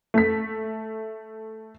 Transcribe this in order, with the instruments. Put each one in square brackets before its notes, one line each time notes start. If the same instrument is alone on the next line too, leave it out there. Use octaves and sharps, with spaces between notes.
[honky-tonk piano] A3 B6